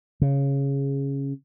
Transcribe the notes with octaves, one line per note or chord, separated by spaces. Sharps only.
C#3